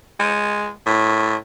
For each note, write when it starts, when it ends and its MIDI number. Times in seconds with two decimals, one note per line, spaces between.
0.20 0.70 56
0.86 1.36 45